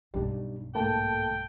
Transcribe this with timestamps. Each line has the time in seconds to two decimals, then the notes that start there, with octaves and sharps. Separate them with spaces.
0.14 B1 G2 G3 D4 D#4
0.75 G#2 D3 A3 A#3 G5 A5